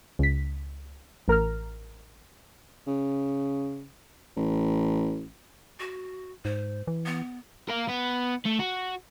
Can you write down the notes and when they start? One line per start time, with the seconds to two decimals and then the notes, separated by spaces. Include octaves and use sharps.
0.19 C#2 B6
1.28 A1 A#4 A#5 F6
2.87 C#3
4.36 A1
5.80 F#4
6.45 G#2 C5
6.87 E3
7.06 B3
7.69 A#4 F5
7.88 B3
8.45 A3
8.59 F#4